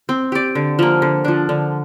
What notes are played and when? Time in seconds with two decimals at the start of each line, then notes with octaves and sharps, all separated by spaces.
0.09 C4
0.32 G4 D5
0.55 D3
0.79 F3 A#3
1.02 D3
1.24 F3 D4
1.49 D3